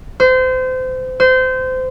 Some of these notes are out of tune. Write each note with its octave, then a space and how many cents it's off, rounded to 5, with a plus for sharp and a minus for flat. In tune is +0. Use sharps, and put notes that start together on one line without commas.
C5 -30
C5 -25